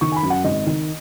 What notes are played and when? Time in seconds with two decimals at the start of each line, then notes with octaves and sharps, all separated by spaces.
0.01 D#3 C#6
0.12 G#5
0.16 B5
0.23 F#2
0.30 F#5
0.44 G#1 D#5
0.67 D#3